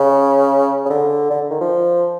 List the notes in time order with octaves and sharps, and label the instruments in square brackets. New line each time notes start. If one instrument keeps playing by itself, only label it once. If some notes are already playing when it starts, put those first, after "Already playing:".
Already playing: [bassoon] C#3
C#3
D3
D3
D#3
F3